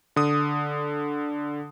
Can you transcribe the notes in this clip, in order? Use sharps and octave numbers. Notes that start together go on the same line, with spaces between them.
D3 D#6